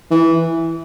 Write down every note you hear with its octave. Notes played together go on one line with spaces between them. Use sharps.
E3